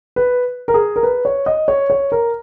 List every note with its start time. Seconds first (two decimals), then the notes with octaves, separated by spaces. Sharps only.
0.16 B4
0.68 A#4
0.74 G#4
0.96 A#4
1.03 B4
1.25 C#5
1.46 D#5
1.68 C#5
1.90 C#5
2.12 A#4